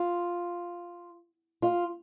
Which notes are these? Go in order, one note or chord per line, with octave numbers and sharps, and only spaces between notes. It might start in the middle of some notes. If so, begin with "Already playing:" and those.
Already playing: F4
F4